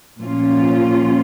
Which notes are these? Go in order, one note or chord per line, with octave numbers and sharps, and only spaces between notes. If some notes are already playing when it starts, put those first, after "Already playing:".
A#2 F3 C#4 F4